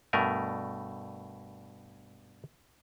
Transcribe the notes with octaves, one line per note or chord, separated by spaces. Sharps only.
G2 B2 A3 A#4 G#5